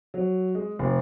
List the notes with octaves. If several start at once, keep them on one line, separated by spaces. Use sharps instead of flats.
F#3
G#3
F1